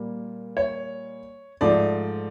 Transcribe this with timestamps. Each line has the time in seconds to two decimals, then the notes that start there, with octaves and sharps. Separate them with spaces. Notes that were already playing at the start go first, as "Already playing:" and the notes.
Already playing: A#2 G3 A#3
0.57 C#5
1.61 G#2 F3 A3 D5